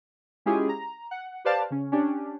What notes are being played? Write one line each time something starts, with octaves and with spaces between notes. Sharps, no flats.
G#3 C#4 E4 F4 G4 G#4
A#5
F#5
G4 B4 C5 D5 F5 A5
C#3 C#4
C#4 D4 G4